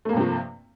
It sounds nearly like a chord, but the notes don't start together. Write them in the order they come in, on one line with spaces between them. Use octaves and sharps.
A3 A#3 G2 C3 F3